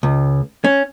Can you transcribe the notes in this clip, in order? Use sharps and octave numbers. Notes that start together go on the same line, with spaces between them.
C#2
C#4